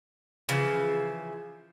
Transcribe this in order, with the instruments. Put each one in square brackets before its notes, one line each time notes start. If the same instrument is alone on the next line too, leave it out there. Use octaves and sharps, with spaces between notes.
[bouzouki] C#3 E3 F3